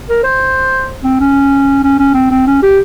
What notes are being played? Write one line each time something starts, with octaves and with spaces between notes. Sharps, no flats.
A#4
C5
C4
C#4
C#4
C#4
C4
C4
C#4
G4